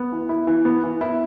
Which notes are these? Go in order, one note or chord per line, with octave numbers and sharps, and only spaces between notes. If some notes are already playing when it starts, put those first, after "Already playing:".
Already playing: B3
E3
E4
E3
B3
E3
E4